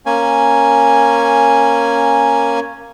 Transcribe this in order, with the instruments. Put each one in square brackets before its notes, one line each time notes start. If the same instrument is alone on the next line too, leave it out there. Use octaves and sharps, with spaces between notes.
[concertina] A#3 C#4 G#5